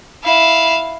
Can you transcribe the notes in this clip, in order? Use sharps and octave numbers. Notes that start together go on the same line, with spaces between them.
E4 F5